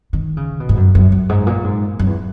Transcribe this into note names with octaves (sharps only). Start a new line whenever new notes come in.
D#3
C#3
B2
G#2
F#2
F#2
F#2
G#2
A#2
G#2
F#2
E2